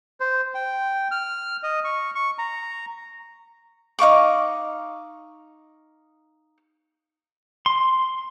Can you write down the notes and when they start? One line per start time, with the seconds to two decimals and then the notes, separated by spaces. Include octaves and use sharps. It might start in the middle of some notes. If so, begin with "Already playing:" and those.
0.20 C5
0.55 G5
1.11 F6
1.63 D#5
1.84 C#6
2.15 C#6
2.38 A#5
3.99 D#4 F5 C#6 D6
7.66 C6